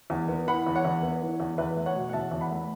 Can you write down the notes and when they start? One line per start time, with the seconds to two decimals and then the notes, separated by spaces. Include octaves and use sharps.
0.10 E2
0.28 B3
0.47 E3 F#5 B5
0.66 E2
0.75 C#5 F#5
0.85 E2
1.03 B3
1.22 E3
1.40 E2
1.58 E2 B4 E5
1.76 A3
1.86 C#5 F#5
1.95 B2
2.09 F#5
2.13 E2 E5 A5
2.31 E2
2.41 F#5 B5
2.51 A3